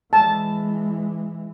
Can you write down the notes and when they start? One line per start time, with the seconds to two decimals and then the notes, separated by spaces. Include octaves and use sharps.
0.13 E3 G#3 A5